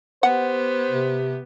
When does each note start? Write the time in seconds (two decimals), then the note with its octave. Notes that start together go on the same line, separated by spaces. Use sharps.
0.23 B3 G4 C5 F#5
0.91 C3